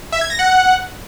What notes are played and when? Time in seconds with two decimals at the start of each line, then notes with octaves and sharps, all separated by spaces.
0.12 E5
0.21 G#6
0.30 A#6
0.39 F#5